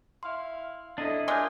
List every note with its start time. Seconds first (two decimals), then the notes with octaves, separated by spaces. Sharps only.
0.23 E4 F5 C6
0.98 D4 E4 A4 D#5
1.28 G#3 F4 A#4 D6 F#6 G6